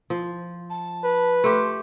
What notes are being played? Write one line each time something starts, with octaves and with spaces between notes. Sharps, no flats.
F3
A5
B4
A3 G4 C6